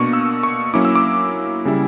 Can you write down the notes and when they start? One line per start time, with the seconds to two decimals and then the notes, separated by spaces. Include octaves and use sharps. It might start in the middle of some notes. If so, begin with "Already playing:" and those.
Already playing: B2 A#3 D4 C#6
0.13 E6
0.43 C#6
0.74 F#3 A#3 C#4 E4 D6
0.85 E6
0.95 D6
1.65 C#3 G3 C#4 E4